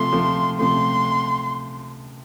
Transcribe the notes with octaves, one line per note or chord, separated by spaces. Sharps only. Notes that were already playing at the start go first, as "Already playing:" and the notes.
Already playing: C3 F3 A3 C6
C3 F3 A3
C3 F3 A3 C6